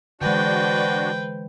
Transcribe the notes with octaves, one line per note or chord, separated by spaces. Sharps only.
D3 E3 G#3 D4 F#4 B4 C5 G5